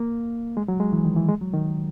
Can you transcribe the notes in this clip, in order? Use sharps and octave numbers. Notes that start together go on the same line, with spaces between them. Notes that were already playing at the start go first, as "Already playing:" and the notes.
Already playing: A#3
G#3
F#3
G#3
E3
D#3
E3
G#3
F#3
D#3